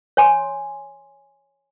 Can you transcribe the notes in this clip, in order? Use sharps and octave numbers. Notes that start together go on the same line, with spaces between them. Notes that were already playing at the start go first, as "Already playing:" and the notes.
C#5 G#5 C6